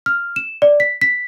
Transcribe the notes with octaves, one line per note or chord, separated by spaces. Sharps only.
F6
E7
D5
B6
B6